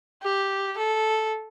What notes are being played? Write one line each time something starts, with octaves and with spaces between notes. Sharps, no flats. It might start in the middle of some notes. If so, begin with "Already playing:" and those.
G4
A4